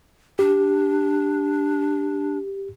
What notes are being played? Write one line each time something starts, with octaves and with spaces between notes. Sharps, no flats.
D4 G4